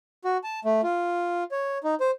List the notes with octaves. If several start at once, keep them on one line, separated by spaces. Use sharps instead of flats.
F#4
A5
A3
F4
C#5
D#4
C5